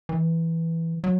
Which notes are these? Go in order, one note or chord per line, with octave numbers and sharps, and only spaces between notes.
E3
F#3